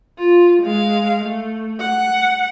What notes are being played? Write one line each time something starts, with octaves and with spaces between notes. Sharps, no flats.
F4
G#3 F5
A3
F#5